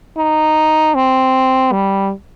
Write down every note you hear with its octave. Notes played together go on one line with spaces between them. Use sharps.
D#4
C4
G3